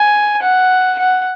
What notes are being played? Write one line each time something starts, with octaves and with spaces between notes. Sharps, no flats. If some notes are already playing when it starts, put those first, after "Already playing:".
Already playing: G#5
F#5
F#5